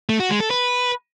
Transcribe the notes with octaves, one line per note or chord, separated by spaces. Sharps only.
A3
F#4
G#3
A4
B4